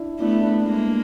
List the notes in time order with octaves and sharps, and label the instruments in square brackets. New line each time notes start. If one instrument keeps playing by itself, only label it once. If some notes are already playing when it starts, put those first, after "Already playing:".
Already playing: [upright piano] D4 E4
[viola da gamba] A3 B3 [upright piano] D4 E4
[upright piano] D4 E4
[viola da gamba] G#3 A#3